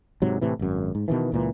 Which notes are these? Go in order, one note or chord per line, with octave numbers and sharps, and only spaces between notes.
G#2 C3 F#3
A2 C3 E3
G#1 F#2
G#2
B2 D#3 E3
C#2 A#2 E3